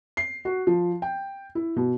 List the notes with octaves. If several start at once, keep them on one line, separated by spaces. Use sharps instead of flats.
C7
F#4
F3
G5
E4
B2